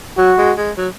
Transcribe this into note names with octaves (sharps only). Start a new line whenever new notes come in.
F#3 F#4
G#3
G#3
F#3